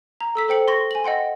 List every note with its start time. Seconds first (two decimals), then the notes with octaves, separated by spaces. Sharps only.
0.21 A#5
0.35 A4 E6 B6
0.48 A4 C5 G5 C#7 F#7
0.68 C6 C#6 A#6
0.91 G#5 F#7
1.04 D#5 F#5 G5 C6